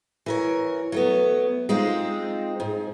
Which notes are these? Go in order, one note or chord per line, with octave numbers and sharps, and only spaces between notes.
E3 A#4 C#5
F#3 A3 B3
G#3 C4 D#4 F4
G#2